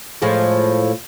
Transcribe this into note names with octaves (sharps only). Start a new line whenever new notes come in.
A2 F3 G#3